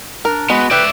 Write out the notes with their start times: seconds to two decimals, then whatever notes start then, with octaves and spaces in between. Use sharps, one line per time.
0.25 D4 A#4
0.50 G#3 B3 F#4
0.71 G4 B4 D5 E5